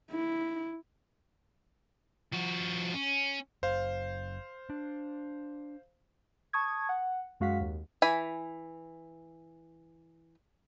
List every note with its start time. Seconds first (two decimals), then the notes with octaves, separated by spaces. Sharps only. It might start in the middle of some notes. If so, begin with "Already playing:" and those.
0.12 E4
2.33 F3 F#4
2.94 C#4
3.63 F#1 C5 F5
4.70 D4
6.53 A5 C#6 D#6 G#6
6.89 F#5
7.40 F#2 G#3 F#4 F5 F#5 B6
7.61 D#2
8.02 E3 G#5 B5